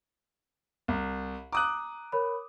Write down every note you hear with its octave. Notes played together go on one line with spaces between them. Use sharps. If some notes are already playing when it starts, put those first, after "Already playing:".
C2
A#5 D6 D#6 F#6
A#4 C#5 B5